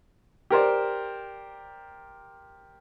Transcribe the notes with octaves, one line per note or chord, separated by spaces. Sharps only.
G4 A#4 C5 D5